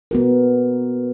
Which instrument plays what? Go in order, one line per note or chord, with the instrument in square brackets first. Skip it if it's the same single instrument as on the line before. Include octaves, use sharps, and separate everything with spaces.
[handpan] B3 F#4 A#4